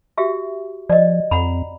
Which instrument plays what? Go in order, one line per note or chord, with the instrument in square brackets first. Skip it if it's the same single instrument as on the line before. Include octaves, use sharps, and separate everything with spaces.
[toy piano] F#4 G4 E5
[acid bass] F3 [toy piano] D5 D#5
[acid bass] F2 [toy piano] F#5 A#5 B5